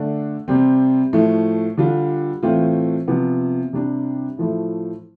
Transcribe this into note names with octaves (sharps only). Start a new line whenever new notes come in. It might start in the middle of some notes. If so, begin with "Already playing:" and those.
Already playing: D3 A3 D4
C3 G3 C4
A2 F3 A3
D3 G3 D4 F4
A2 E3 A3 C4 F4
C3 F3 B3
C3 G3 D4
A2 F3 A3 E4